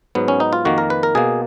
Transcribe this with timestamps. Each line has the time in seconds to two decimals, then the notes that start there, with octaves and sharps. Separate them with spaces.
0.15 G#2 F#3 B3
0.28 C#4
0.40 D#4
0.53 F4
0.65 F2 D#3 A#3 F#4
0.78 A#4
0.90 B4
1.03 A#4
1.15 B2 A#3 G#4